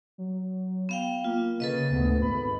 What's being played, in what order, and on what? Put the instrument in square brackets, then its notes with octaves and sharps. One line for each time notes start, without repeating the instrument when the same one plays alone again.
[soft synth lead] F#3
[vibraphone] B3 F5 G5
[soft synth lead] A#3 [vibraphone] F4
[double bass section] C#3 [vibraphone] A4 B4 D#5
[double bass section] D2 G#2 [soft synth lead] B3
[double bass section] G#1 G#2 [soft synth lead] B5